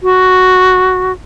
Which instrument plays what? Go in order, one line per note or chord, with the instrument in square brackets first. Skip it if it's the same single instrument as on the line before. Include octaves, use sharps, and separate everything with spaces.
[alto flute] F#4